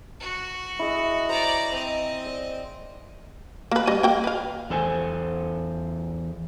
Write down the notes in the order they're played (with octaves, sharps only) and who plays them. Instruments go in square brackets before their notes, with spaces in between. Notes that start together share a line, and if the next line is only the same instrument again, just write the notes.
[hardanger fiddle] F#4
[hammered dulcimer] E4 G#4 D#5
[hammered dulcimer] C5 [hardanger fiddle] D5 A#5
[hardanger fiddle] C4 D#5
[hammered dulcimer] D5
[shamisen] A#3 B4
G3 D#5
A#3 G5 G#5
B4 F5
[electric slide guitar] E2 A4 C5 G#5